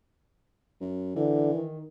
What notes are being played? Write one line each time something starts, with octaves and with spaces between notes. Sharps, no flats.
F#2
D3 E3
D#3